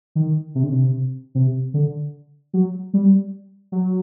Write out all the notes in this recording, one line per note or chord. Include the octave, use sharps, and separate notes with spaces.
D#3
C3
D3
C3
C3
D3
F#3
G3
F#3